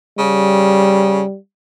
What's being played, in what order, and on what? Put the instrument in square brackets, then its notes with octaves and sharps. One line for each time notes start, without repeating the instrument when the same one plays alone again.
[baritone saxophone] C#3 [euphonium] G3